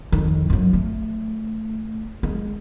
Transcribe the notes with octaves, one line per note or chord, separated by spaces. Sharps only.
F2 D#3
F#2 F#3
A3
G#3